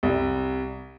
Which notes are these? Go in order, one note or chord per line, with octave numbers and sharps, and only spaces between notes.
C2